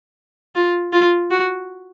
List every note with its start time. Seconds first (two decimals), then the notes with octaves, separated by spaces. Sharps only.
0.55 F4
0.93 F4
1.31 F#4